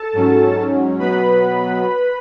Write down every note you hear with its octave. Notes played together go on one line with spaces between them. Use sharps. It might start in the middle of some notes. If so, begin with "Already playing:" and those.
Already playing: A4 A5
G#2 F#3 C#4
B2 F#3 B3 B4 B5